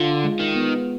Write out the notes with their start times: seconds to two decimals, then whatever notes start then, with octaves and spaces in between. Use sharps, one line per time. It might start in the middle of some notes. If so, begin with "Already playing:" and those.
Already playing: D3 F4
0.24 G#3
0.39 D#3
0.55 B3